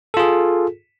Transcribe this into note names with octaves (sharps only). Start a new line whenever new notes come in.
F4 G#4 A4